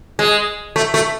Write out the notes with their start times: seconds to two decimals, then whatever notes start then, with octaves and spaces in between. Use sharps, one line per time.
0.19 G#3
0.76 A3
0.94 A3